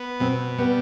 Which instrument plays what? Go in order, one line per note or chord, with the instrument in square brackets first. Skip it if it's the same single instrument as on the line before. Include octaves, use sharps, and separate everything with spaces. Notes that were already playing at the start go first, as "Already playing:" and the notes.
Already playing: [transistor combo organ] B3
[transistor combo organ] B2 [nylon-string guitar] C4
[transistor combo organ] G3 [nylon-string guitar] B3